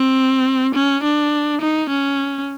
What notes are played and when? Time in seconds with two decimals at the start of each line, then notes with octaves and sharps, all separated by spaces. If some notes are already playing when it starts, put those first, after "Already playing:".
Already playing: C4
0.75 C#4
1.03 D4
1.61 D#4
1.90 C#4